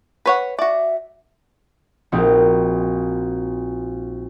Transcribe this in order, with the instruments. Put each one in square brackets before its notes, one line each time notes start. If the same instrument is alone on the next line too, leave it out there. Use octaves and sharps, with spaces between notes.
[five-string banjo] B4 C#5 F#5
[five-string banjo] F#4 D5 [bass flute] E5
[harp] A#1 C4 D#4 F#4